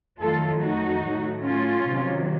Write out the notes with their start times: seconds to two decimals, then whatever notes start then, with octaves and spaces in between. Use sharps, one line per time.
0.20 F2 D#3 F#3 A3 F4 A4
0.61 D#4 F#4
1.03 A2 F#3 A3
1.44 C#4 F4
1.86 C3 D#3 F#3